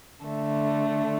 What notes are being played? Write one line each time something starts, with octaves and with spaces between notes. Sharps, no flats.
D3 A3